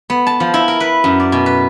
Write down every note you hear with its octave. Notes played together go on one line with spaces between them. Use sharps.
B3
A5
F3
E4
A#4
B4
F#2
D5
B2
B4